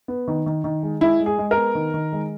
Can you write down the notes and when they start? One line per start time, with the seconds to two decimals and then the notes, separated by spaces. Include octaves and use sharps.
0.08 B3
0.28 D#3
0.46 D#3
0.64 D#3
0.83 G#3
1.01 G#3 E4
1.20 G#3
1.26 G#4
1.39 G#3
1.51 A#4
1.57 B3
1.75 D#3
1.94 D#3
2.13 G#3